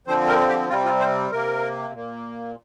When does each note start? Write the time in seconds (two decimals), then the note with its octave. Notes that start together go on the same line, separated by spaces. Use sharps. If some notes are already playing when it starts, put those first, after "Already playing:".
0.07 D3 F3 C4 C5
0.28 A#4
0.48 G4
0.69 C3 G3 C4 F4
0.85 F4
1.00 C5
1.31 C3 A#3 A#4
1.93 A#2 A#3